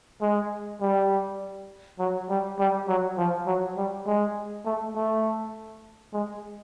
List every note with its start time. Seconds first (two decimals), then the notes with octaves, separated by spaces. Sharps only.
0.22 G#3
0.81 G3
1.99 F#3
2.30 G3
2.59 G3
2.88 F#3
3.18 F3
3.47 F#3
3.77 G3
4.07 G#3
4.66 A3
4.96 A3
6.13 G#3